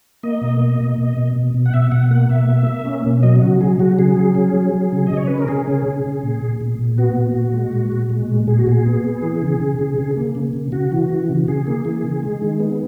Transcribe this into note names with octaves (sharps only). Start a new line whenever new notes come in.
A#3 D#5
B2
A#3
B2
B2
B2
B2
B2
F#5
B2 E5
B2 F#5
A#3 F#5
B2 E5
A#3
A#3
C#4
B2
F#3 D#5
C#3 F#4
F#3 G#4
F#3 F#4
C#3 G#4
F#3
C#4
F#3
F#3
C#3
C#3 D#5
C#5
C#4 B4
A#4
C#4 G#4
C#3
C#3
C#3
A#2
A#2
A#2
A#2
B3 F#4
A#2
A#2
G#3
A#2
A#2
G#3
A#2
A#2 G#4
F#4
A#2 G#4
B3
B3
E3
C#3
C#3
C#3
C#3
A#3
C#3
C#3
C#3 F#4
E3
E3
C#3
C#3 G#4
A#3
E3
C#3
G#3
D#3
B3